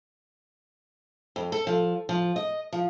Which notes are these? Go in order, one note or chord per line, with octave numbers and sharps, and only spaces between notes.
F2
A4
F3
F3
D#5
F3